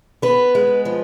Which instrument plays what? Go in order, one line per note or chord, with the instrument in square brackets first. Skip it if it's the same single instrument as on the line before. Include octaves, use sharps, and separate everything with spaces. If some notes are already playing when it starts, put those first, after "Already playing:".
[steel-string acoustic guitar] B3 B4
G#3
F3